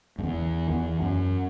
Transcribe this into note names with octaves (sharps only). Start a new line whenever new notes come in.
F#2
E2
E2
F#2